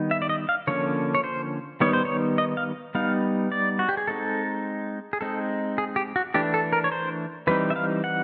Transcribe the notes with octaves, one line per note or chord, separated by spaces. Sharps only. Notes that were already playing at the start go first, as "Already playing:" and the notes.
Already playing: D#3 G3 B3 D#4
E5
D5
D#5
F5
D3 F3 A#3 C#4 C#5
C#5
C5
D#3 G3 B3 D#4 C#5
C5
C#5
D#5
F5
G3 B3 D#4 F5
D5
F#4
G4
G#4
G#3 C4 D#4 A4
G#4
G#3 C4 D#4 A4
G#4
G4
F#4
E3 A3 D4 G4
A4
A#4
C#5
C5
E3 G3 C4 D#4 B4
E5
F5
F#5